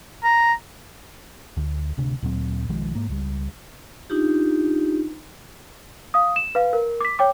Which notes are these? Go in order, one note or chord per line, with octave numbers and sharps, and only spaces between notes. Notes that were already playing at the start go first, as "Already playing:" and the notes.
A#5
D2
D1 D2 C3 D4
D2 A#2 F#3 C4
B1 D#3 F3 G#3
G#2 A#3
C#2 G3
D4 D#4 F4 G4
F5 D#6
E7
B4 F5
A#4
D6 B6
C#5 G5 D6